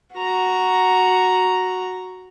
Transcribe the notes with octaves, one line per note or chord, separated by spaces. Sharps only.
F#4 A#5